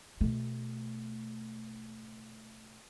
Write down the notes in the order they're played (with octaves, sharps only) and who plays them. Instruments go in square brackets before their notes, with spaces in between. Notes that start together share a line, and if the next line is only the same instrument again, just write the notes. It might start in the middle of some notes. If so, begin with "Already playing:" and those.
[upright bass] B2 A3